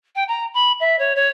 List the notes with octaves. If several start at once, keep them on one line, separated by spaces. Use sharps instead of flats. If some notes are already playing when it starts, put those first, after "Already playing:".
G5
A#5
B5
E5
C#5
C#5